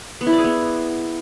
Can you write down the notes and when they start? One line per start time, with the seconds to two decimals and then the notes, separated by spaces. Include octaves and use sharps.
0.21 B3
0.27 E4
0.32 D5
0.38 G#4
0.44 B3